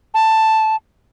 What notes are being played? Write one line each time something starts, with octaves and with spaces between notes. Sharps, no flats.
A5